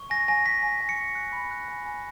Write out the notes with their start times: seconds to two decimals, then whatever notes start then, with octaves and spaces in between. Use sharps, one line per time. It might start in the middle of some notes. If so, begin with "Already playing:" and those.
Already playing: C#6
0.10 G#5 A#6
0.28 G#5 A#6
0.45 C#6 B6
0.63 G#5 B6
0.80 G#5
0.89 C#7
0.98 C#6
1.15 F#6
1.32 B5
1.51 F#6
1.68 G#5
1.86 G#5